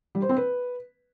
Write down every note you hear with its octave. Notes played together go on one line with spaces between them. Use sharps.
G3
C5
C4
B4